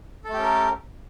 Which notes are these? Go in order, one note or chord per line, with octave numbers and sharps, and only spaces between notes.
A3 C#4 G4 A4 A#4